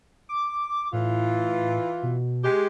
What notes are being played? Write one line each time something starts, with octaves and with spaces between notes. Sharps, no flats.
D6
A2 E3 F4
B2
G#3 G4